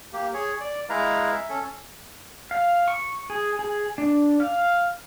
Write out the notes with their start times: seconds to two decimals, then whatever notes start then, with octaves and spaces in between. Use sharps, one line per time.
0.13 A#3 G4
0.34 G#4 C#5
0.60 D5
0.90 G#3 E4 B4 F5 A#5
1.32 E5
1.49 C#4 A4
2.51 F5
2.88 C#6
3.30 G#4
3.59 G#4
3.98 D4
4.40 F5